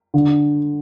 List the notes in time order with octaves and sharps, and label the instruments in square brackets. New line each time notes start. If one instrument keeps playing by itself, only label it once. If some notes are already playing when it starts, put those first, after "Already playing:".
[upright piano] D3